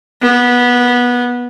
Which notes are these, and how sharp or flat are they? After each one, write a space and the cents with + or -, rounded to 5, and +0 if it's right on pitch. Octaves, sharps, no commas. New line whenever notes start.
B3 -15